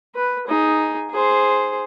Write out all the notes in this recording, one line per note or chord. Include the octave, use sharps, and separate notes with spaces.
B4
D#4 G#4
G#4 C5